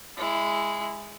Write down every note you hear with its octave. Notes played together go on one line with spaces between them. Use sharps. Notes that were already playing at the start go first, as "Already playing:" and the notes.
G#3 E4